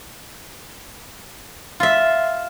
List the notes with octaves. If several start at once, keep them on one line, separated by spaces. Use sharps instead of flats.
F4 E5